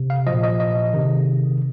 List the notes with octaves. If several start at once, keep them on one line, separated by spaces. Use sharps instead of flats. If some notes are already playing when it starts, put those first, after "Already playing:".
Already playing: C3
F5
A#2 F3 D#5
D#5
D#5
C3 D#3